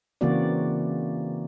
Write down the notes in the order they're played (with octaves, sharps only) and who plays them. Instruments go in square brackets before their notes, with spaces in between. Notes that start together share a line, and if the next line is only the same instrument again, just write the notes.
[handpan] C#3 E3 A#3 C4 F#4 D5